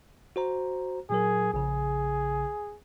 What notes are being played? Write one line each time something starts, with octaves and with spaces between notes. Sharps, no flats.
F#4 C5 A#5
A#2 F#3 G#4 A#4
A#1 C#3 G#4